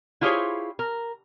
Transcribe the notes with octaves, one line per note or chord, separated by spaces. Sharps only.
E4 F4 G4 G#4 C5 C#5
A#4